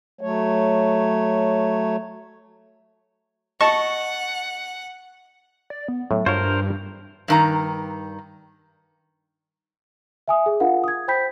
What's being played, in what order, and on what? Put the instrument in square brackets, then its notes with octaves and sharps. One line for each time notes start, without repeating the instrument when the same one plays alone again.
[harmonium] F#3 A3 C#5
[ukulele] D#5 [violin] F#5 [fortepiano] A5 [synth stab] C#6
[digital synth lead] D5
B3
[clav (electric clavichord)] A2 [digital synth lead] F#3
[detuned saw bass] G2 [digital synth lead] D4 [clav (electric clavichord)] F4 F#4 C#5 [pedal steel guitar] A#4 C5
[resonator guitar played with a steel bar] G2 D#3 A#5
[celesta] E5 G#5 D#6
G#4
D4 F4 A#4 F5 F#5
D#6 G#6
C5 G5 B5 G6 B6